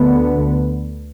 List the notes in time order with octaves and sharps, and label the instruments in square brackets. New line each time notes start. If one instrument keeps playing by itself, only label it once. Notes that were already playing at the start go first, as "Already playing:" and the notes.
Already playing: [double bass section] D2 D3 B3